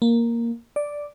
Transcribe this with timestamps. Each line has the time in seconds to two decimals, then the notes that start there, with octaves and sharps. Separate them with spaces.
0.02 A#3
0.76 D5